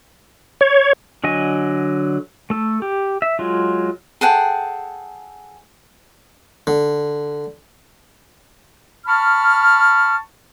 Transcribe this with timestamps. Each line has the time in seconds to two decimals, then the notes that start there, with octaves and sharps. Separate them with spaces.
0.61 C#5
1.24 D3 F#3 D#5 G#5
2.50 A3 A4
2.82 G4
3.22 E5
3.39 F#3 G#3 F4
4.21 G#4 A4 F#5 G5
6.67 D3
9.06 A5 B5 C#6 F6